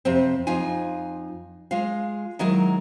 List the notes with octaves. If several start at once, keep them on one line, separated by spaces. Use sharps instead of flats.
F2 C3 C4
F2 D#4 F4 G#5
G#3 F4 F5
D#3 F#3 G#3 E4 A#4